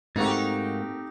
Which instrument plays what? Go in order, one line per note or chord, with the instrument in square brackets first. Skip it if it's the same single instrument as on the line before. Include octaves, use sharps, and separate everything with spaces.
[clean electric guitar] G#2 A#3 F#4 [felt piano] A3 C4 [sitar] D#4 G4